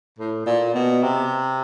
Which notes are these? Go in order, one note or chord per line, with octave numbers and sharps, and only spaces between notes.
A2
A#2
B2
C3